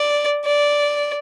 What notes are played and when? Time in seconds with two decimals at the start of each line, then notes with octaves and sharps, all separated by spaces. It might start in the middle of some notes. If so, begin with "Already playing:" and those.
Already playing: D5
0.46 D5